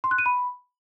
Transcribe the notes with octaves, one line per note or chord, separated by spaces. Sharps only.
C6
F#6
D#7
B5